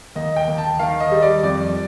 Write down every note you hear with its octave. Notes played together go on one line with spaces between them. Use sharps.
D#2 D#5
G5
D#2
A5
D#3 F5
D#5
G3
D5
F2 D5